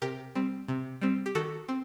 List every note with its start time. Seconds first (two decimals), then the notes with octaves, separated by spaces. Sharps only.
0.02 C3 G4 A#4
0.35 G3 C4
0.68 C3
1.01 G3 C4
1.26 G4
1.35 D#3 F#4 A4
1.68 C4